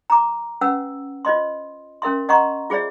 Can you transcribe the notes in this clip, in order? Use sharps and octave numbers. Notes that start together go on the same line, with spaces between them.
A#5 D6
C#4 B4 F#5 E6
F4 C5 D#5 C6
C#4 A#4 E5 C6
D#5 F#5 A#5 C6 C#6
F4 G#4 C5 D5 E5